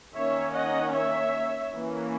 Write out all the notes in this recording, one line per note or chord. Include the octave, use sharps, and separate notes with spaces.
D#3 A#3 C#4 C#5 E5
D#5 F#5
C#5 E5
E3 A#3 C#4